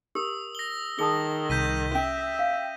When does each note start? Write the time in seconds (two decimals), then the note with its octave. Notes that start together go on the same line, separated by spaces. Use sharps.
0.15 G4 A#4 D#6 E6
0.55 A#6 G7
0.99 D#3 G#4 A5 D#6 G7
1.50 C2 G6 B6 D#7
1.95 C#4 E5 G5
2.39 F5